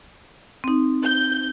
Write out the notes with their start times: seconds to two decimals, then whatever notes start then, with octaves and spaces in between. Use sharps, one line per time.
0.64 C4 D#4
1.04 G6